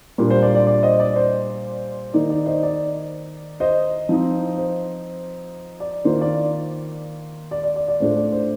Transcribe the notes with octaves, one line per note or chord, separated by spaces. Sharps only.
A#2 G3 A#3 D4 F4
C5
D5
D5
D5
C5 D#5
D5
C5
D#3 A#3 D#4 D5
D5
C5 D#5
D5
C5 D#5
F3 C4 D#4
C5
D5
D#3 A#3 F4 C5
D5
D5
D5
D5
D5
A2 A3 D4 F4 C5
D5
C5